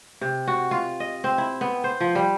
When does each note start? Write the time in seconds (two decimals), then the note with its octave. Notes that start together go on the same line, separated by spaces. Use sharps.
0.21 C3
0.47 F#4
0.71 F4
1.00 D#5
1.24 C4
1.38 E4
1.61 B3
1.84 C5
2.00 F3
2.15 G3